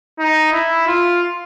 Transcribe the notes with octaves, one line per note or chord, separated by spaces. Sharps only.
D#4
E4
F4